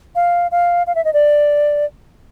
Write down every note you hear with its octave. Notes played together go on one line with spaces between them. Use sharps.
F5
F5
F5
E5
D#5
D5